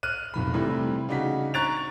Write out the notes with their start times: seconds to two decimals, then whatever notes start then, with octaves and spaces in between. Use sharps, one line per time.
0.03 F6 F#6 D#7
0.34 F1 B1 B5
0.54 C3 E3 G3 A3
1.09 C#3 D4 D#4 F#4 B6
1.54 A#5 C#6 F#6 A6 D7 F7